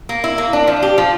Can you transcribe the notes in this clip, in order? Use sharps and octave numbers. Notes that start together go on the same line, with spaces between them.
A#3
E4
A#3
D4
F3
G4
F3